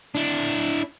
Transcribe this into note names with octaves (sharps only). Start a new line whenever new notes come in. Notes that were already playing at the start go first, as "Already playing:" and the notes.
D4 E4